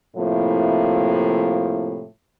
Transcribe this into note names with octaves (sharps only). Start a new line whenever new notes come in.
A2 C3 F3 A#3 E4